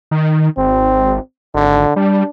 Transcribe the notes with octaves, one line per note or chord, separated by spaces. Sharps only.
D#3
G#1 C4
G#1 D3
G3 D4